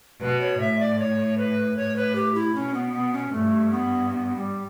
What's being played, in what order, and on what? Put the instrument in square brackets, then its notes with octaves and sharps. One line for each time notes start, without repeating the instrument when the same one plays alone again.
[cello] B2 [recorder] B4
[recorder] C#5
[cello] A2 [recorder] E5
[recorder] D5
C#5
B4
[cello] A2 [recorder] C#5
[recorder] B4
G4
E4
[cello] B2 [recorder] C#4
[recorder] B3
B3
C#4
[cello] G2 [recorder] A3
[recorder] B3
B3
G3